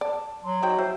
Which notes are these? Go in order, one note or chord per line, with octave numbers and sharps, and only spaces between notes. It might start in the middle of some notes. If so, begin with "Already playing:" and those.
D5 A5
F#3 C6
D#4 F#4 C5 G5
E4 C5